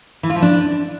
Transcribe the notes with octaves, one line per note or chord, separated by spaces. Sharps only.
E3
F4
F3
D4